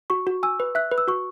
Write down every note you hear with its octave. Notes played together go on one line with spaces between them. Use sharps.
F#4 C#6
F#4
G#5 E6
B4
E5 F#6
B4
E6
F#4 C#6